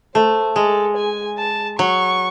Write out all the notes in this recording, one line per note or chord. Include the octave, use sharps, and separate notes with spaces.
A3 C5
G#3 A4
G#5
A5
F#3 C#6